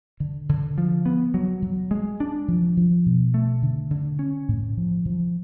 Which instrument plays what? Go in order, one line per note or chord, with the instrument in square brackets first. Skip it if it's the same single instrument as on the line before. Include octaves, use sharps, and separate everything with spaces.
[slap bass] D3
D3
F3
B3
F#3
F#3
G#3
D4
F3
F3
B2
A3
D3
D3
C#4
A2
F3
F3